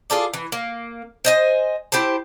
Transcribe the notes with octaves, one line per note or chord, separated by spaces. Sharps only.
F4 G#4 A4 D5
E3
A#3
C5 D#5 G#5
E4 G4 C5 A5